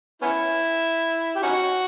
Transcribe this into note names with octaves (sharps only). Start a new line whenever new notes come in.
B3 C#4 E4
G4
C#4 D#4 F#4